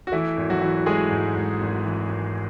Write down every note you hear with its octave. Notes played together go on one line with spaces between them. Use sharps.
F#4
E3 A3 E4
G#1
F#3 F#4
E3
G#3 A3 G#4
G#2
G#2
G#1
E3
G#1